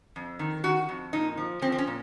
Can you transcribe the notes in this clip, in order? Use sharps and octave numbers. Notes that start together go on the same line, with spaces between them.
F2
D#3
D#3 F#4
F2
A#2 D#4
F3
F3 C4
C4
C#4
A#2